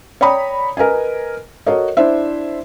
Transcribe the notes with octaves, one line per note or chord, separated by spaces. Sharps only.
C#5 D5 G5 A#5 B5 D#6
A#4 B4 D#5 G#5
F#4 A4 A#4 C#5 D#5
D4 E4 C5 E5